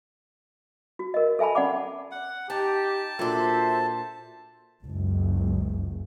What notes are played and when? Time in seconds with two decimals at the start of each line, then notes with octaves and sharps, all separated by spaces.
0.99 F#4
1.14 A#4 D#5
1.39 A4 E5 G#5 A5 B5
1.55 C#4 D5 F#5 B5 D6
2.11 F#5
2.50 D#4 G4 A5
3.19 A#2 D4 F#4 A4 C5 E5
4.84 F#1 C#2